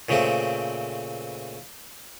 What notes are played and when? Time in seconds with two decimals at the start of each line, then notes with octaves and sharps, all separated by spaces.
0.09 A#2 C#3 A3 C4